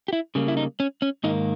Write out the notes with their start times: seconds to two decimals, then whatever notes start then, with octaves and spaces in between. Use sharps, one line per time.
0.08 G4
0.13 E4
0.35 C#3 G3 A#3
0.48 E4
0.57 D#4
0.80 C#4
1.02 C#4
1.24 G#2 D#3 A#3 D#4